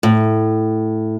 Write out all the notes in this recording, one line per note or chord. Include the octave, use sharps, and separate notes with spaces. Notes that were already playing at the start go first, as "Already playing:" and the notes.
A2